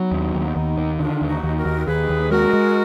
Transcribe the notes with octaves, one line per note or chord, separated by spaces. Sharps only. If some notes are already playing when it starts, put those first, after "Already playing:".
Already playing: F#3 B3 D#4
D#2
D#2
D#2
D#3
D3 D4 F4
D#2
D#4 F#4
D#2
F#4 A#4
D#2
D#2 G#4 B4
D#2
G#3 F#4 A#4
G#3